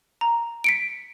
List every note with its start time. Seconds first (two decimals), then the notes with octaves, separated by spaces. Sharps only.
0.21 A#5
0.64 B6 C#7 D7